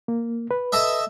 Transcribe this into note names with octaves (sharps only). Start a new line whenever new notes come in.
A#3
B4
A4 D#5 E5